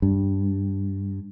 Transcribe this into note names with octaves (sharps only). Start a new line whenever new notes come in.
G2